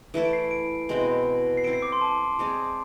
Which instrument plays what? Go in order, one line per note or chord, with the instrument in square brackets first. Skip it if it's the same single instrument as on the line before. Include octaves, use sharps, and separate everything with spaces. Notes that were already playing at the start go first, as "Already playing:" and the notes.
[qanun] E3 A3 E4 A4
[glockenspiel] D7
C7
D7
[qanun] B2 G#3 C4 E4
[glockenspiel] C7
[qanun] C4 E4 A4 [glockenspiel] D7
[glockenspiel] C7
D6
C6
A5
[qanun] G#3 C4 G#4 D5